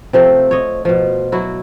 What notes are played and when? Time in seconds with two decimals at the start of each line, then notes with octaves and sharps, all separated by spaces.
0.13 C3 F3 A3 C4
0.51 C#5 D#5
0.85 B2 F3
1.32 F#3 E4 F#4